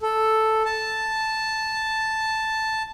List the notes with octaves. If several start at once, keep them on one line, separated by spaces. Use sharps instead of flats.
A4
A5